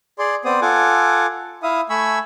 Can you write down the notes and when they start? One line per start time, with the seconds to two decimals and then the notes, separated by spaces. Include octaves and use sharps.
0.19 G#4 D5 C6
0.45 B3 C4 C5 D5 D#6
0.62 F4 A4 F#5 G#5 D6
1.63 E4 E5 F5 D#6
1.90 A3 G#5 B5 C#6 E6